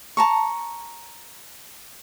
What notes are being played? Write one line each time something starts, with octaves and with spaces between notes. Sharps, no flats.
A5 A#5 C#6